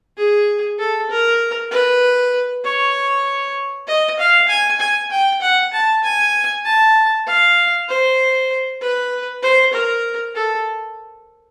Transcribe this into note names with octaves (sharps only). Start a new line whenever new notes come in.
G#4
A4
A#4
B4
C#5
D#5
F5
G#5
G#5
G5
F#5
A5
G#5
A5
F5
C5
B4
C5
A#4
A4